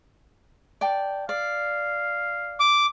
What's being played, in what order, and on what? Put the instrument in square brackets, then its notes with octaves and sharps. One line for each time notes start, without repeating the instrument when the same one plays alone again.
[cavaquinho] D5 G5 A5
[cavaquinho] D5 [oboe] F5
[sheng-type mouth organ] D6